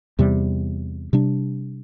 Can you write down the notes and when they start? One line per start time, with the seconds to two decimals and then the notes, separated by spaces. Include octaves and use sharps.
0.19 E2 C3 G3
1.13 C3 G3 D4